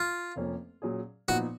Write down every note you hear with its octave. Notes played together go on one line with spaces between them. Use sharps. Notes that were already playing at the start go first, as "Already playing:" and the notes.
Already playing: F4
F1 F2 F3 A#3 C#4
A#2 F#3 C#4 G#4
A#2 F3 B3 D#4 F#4